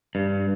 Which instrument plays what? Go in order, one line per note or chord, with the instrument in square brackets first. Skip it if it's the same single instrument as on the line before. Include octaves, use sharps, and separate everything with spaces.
[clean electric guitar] G2